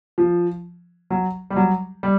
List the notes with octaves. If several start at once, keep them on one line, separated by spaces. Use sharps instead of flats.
F3
F#3
G3
F#3
G3